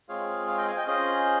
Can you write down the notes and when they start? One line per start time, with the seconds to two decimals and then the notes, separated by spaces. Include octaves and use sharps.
0.09 G#3 C4 F4 G#4 C#5 F5
0.48 C#5 F5
0.58 D#5 G5
0.67 F5 G#5
0.77 D#5 G5
0.87 C#4 F4 G#4 C5 D#5